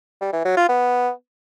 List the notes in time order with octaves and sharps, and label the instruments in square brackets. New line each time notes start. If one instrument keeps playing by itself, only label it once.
[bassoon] G3
E3
F#3
F4
B3